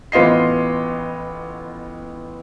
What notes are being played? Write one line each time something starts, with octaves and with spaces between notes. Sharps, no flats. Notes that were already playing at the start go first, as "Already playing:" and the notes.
A1 B3 F4 D#5 C7